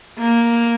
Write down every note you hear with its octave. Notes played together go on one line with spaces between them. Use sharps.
A#3